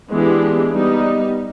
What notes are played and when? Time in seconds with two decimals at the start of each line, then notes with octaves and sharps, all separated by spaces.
0.11 E3 G#3 B3 D4 G4
0.72 G3 B3 D#4